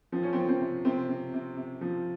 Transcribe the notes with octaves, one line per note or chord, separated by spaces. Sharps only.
F3 C4
C#4
F3 C4
C4
C3
C3 C4
C3
C3
C3
F3